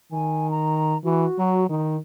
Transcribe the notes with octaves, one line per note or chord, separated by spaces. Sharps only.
D#3 G#5
A#5
E3 F#4
F#3
D#3 D#4